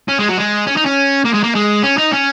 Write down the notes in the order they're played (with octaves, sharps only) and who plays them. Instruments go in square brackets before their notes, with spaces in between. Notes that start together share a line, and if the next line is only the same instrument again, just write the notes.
[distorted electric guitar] C#4
G#3
F#3
G#3
C#4
D#4
C#4
A#3
G#3
A#3
G#3
C#4
D#4
C#4